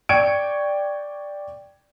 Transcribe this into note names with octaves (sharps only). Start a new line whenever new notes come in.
D5 G5 C#6 G#6 C#7 D7